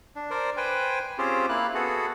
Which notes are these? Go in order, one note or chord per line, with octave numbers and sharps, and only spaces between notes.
D4
A#4 C5 D5
B4 C5 G5 G#5
C4 C#4 F4 G4 G#4 C5
A#3 E4 F5 F#6
B3 F#4 G#4 A4